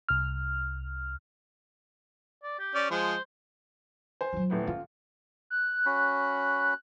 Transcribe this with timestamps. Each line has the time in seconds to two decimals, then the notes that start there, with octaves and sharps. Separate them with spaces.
0.09 C2 F6
2.43 D5
2.59 G4
2.75 C#4 D5
2.91 F3 G#3 C5
4.21 C5 G#5
4.33 F#3 F4
4.50 D#1 A2 B3
4.67 C#4 F4
5.50 F#6
5.86 C#4 F#4 B5